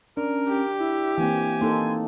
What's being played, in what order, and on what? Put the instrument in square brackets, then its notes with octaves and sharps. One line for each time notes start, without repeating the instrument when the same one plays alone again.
[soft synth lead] C#4 [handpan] D4 [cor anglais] A#4
[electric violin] G4
[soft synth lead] E4 [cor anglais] E5
[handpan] E3 A#3 C4 [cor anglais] G#5
[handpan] A#3 D#4 A4 [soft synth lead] C6